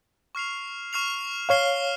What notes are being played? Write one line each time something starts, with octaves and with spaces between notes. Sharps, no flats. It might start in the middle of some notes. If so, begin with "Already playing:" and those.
C#6 F6 C7 F7
C#6 F6 C7 F7
C#5 F5 C#6 F6 C7 G7